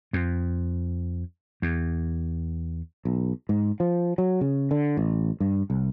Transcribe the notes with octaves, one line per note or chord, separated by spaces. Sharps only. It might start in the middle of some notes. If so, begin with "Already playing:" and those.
F2
E2
B1
G#2
F3
F#3
C#3
D3
A1
G2
C2